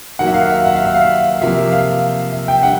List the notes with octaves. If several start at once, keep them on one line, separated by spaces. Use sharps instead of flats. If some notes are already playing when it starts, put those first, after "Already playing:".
D#3 F#3 A#3 F#5
E5
F5
E5
F#5
F5
E5
F5
C3 F3 A#3 E5
F5
E5
G5
D3 G3 F#5